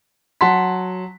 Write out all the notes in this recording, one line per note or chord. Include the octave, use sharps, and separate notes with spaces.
F#3 F#5 A5 C6 B6